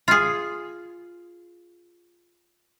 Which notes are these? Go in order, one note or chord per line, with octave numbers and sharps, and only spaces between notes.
F4 G#4